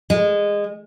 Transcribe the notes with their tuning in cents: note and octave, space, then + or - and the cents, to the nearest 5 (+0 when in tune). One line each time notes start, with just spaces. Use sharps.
G#3 -20